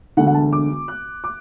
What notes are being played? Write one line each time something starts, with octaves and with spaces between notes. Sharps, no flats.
E1 D2 D3 F#5
F#5
A5
D6
F#6
D6